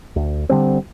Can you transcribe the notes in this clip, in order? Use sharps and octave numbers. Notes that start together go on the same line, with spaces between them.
D2
D3 G3 C4